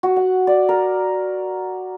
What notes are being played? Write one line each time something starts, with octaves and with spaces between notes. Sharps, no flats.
F#4
F#5
D5
A#4